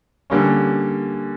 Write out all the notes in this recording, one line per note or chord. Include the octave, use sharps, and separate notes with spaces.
D3 G3 A#3 C#4